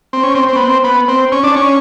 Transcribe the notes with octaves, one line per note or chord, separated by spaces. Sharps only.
C4
C#4
C4
C4
B3
C4
B3
C4
C#4
D4
C#4